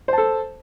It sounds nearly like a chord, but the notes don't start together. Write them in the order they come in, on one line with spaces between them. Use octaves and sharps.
C5 A5 A4